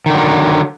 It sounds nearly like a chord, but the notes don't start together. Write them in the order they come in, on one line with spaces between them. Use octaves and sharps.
D#3 D3 F#3